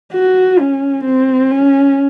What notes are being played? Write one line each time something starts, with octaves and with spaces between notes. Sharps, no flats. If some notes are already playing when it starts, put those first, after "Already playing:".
F#4
C#4
C4
C#4